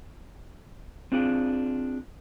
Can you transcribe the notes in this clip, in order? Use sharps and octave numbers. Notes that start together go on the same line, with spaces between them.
C4 D4 F4 G#4 D5